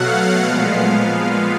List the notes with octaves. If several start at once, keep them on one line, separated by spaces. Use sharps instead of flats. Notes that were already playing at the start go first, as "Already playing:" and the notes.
Already playing: B2 F#3 A3 F5 F#5
A#2 F3 G#3 B3